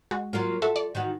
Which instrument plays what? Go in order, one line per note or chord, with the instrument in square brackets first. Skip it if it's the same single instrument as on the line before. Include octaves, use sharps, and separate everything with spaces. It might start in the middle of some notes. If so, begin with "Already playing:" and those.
[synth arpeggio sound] G#3 F#4
[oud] F#3 A#3 F4
[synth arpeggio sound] F#4 E5 [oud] A4
[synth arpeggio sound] D5
[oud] D#3 E3 F#4